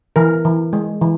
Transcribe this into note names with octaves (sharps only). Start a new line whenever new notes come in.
E3 A#4
E3
G#3
E3